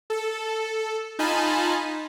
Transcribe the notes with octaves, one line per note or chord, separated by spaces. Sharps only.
A4
D#4 F4 D#5 G#5 A5 B5